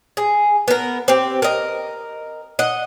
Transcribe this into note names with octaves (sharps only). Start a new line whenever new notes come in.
G#4
B3 A#4
C4 G4
A#4 D#5
D#5 F#5